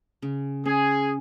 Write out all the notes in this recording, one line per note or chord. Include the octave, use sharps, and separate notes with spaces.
C#3
C#4 G#4